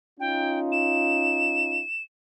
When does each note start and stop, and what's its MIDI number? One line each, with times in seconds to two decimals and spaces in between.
0.20 1.82 61
0.20 1.82 63
0.20 1.82 65
0.20 0.59 79
0.72 2.02 100